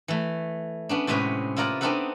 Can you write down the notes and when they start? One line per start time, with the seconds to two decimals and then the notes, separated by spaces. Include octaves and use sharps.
0.08 E3 A3
0.89 B3 C#4 D4
1.07 A2 C3 G#3 C#4 B4 D#5
1.56 E4 F4 A#4 D5 D#5 F#5
1.81 B3 C4 D4 D#4 A4 F#5